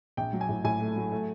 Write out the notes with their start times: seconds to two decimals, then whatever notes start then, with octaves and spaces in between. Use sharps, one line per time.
0.17 A#1 G5
0.33 F#3
0.41 G#5
0.49 A2
0.64 A2 G#5
0.80 A3
0.96 F#3
1.12 A3